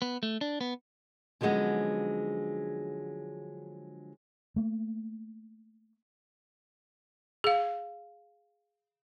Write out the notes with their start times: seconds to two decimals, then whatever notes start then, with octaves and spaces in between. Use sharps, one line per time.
0.02 B3
0.23 A3
0.41 D4
0.61 B3
1.41 D3 F3 F#3 G#3 B3 C#4
4.56 A3 A#3
7.44 G#4 F5